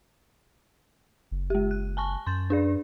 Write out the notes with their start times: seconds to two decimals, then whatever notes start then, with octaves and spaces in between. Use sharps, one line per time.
1.31 F#1
1.50 G#3 G4
1.71 F#6
1.97 G#5 A5 C#6
2.26 F#2 C6 G6 A6
2.50 D4 G#4 D5